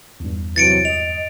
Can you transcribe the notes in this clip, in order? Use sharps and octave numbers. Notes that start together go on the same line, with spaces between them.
E2 G2
C3 E3 F#3 A6 C#7 D7
D#5 F7